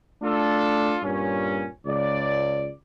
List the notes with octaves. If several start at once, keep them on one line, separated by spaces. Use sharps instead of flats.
A3 D4 F4 A4
G2 A#2 C#4
C#2 D5